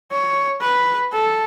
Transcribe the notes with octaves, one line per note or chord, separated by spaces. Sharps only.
C#5
B4
A4